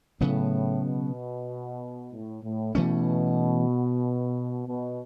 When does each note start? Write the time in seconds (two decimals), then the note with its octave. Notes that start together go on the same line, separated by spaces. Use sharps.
0.21 A2 C#3 F#3 B3
0.84 B2
2.12 A2
2.43 A2
2.75 B2 E3 A3 C#4
4.67 B2